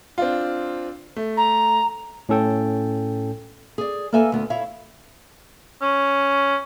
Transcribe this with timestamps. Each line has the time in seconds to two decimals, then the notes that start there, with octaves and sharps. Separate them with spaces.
0.18 C4 D4 F4
1.16 A3
1.37 A#5
2.29 A2 C#4 A4 G5
3.78 G#4 D5
4.12 A#3 A4 B4 E5 F5 G#5
4.32 D2 B3
4.50 E4 C#5 E5 F5
5.82 C#4